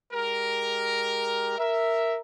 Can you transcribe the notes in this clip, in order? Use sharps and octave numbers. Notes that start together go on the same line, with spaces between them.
G#3 G4 A#4
A#4 E5